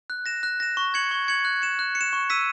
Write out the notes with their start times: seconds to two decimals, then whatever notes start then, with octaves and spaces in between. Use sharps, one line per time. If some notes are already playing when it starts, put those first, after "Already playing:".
0.10 F#6
0.26 A#6 E7
0.43 F#6
0.60 A#6 E7
0.77 C#6
0.94 G#6 C#7 F#7
1.11 C#6
1.28 G#6 C#7 F#7
1.45 F#6
1.62 C#7 E7
1.79 F#6
1.95 C#7
2.01 E7
2.13 C#6
2.30 E6 B6 D#7